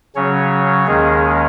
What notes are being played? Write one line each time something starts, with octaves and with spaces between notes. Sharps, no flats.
C#3 F#3 C#4 C#5
D#2 D#3 G#3 C#4 G#4